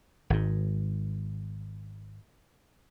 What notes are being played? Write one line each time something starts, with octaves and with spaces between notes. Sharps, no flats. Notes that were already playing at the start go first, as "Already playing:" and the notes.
G#1 G#2